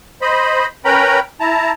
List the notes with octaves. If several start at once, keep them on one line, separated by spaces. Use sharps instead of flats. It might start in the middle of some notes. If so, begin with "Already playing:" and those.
C5 D#5 B5
C#4 A#4 B4 G5 A#5 B5
E4 A5 A#5